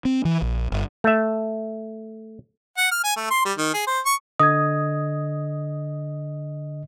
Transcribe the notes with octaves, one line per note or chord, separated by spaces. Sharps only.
C4
E3
A#1
G1
A3 E5
F#5
F6
G#5
A3
C6
G3
D#3
G#4
C5
C#6
D3 D#5 D#6 G#6